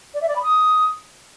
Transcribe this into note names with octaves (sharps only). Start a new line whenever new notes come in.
D5
E5
D5
B5
D#6